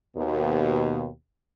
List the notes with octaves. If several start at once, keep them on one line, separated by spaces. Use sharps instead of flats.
D#2 B2